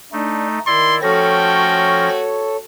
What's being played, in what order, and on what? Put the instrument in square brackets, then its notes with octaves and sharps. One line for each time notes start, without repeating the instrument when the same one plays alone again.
[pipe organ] A3 D#4 [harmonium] D4
[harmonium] D#3 [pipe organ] E4 D5 [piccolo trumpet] C6
[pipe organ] F3 C#4 A#6 [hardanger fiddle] A3 F#4 [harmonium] A4 C#5 [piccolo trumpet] G5